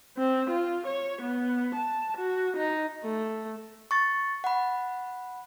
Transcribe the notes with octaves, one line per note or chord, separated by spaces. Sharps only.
C4
F4
C#5
B3
A5
F#4
D#4
A3
C#6 A6
F#5 B5